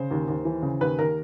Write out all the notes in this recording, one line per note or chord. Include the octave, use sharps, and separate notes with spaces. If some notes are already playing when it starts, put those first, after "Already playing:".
Already playing: C#3 C5
D#2
D#2
E3
C#3
D#2 B4
D#2 A#4